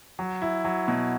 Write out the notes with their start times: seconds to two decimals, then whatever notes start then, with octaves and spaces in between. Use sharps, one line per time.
0.19 F#3
0.42 E4
0.65 F#3
0.88 B2